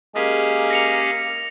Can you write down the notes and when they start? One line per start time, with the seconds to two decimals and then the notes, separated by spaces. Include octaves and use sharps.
0.15 G#3 A#3 C#4 G4 G#4
0.71 A#6 C#7 F7